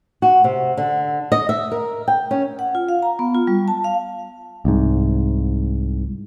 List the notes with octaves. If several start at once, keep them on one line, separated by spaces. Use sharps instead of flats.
F#4
C3
D3
D#5
E5
A#4
G5
C#4
F#5
F4
F5
A#5
B3
F4
G3
A5
F5
C2 G#2